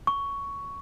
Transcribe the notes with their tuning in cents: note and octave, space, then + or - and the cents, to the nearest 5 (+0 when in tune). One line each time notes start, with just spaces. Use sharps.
C#6 +10